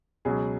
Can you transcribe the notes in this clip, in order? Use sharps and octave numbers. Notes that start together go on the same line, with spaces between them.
C#2 B2 F#3 G#4